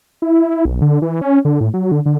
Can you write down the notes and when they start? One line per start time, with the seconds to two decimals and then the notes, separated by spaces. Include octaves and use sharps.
0.22 E4
0.65 B1
0.82 D3
1.02 E3
1.21 C#4
1.45 D3
1.61 A2
1.74 F#3
1.92 D3
2.06 D3